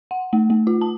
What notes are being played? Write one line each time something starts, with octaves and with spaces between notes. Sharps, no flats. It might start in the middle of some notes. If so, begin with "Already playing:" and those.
F#5
A3
A3
F4
A5